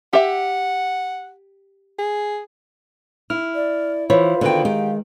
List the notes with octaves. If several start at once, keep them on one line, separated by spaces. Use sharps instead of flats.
G4 E5 F#5
G#4
E4 F6
D5
E3 F4 C5 C#5 B5
F5
D3 D#3 B3 F#4 G5
D#3 G#3 G4